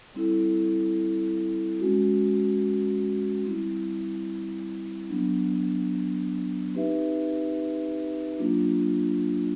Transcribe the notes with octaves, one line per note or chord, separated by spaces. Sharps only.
G3 C4 E4 A4
G#3 C#4 F#4
G3 C4 E4
F#3 B3 D4
C4 D#4 G4 B4 E5
F#3 A#3 D4 F4